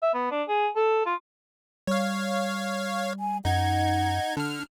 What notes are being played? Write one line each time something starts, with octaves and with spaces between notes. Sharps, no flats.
E5
B3
D4
G#4
A4
F4
G3 C#5 F5
G#5
F#2 D#4 F#5 G#6
D3 D4 F6